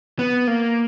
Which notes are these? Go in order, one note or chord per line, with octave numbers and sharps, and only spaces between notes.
B3
A#3